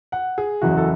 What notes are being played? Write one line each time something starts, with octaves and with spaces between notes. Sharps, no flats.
F#5
G#4
F#1 E2 C#3 E3 F#4
A4